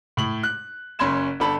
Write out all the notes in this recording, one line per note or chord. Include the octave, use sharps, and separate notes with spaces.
A2 F#7
F#6
F#1 C#4 B5 C6 G#6 E7
G1 D3 A4 B5